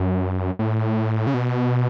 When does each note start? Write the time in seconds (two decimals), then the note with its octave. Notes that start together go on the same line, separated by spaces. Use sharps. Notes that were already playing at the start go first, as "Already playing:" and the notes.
Already playing: F#2
0.59 A2
1.27 C#3
1.34 B2